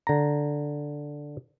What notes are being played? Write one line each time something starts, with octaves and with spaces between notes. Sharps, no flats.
D3 A#5